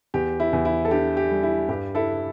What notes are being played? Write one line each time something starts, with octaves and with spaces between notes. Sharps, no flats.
E2 G4
E4
E2
E4
A4
D4 G4
G4
G3
E4
G2 G4
E4 A4